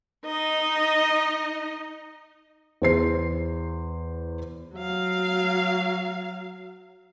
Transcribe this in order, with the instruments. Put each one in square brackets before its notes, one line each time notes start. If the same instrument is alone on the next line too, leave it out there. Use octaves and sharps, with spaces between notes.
[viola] D#4 D#5
[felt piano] E2 C5 C7
[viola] F#3 F5